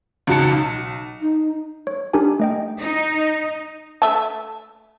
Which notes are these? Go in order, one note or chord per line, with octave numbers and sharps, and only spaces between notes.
C#2 G#2 F#4 A5 C#7
B1
D#4
C#5
D4 D#4 G4 A#4 G#5
A3 D#5 G5
D#4
A3 E5 A5